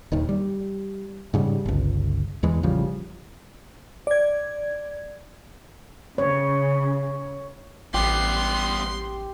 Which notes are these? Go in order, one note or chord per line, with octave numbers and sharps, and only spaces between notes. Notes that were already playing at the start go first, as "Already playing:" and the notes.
D#1 D#2 D#3
G3
G#2 C#3 G3
G1 C#2
E2 E3 G#3
A1 C#3 F3 G3
D5 G#6
C#3 C#5
A1 G3 B3 G4 C6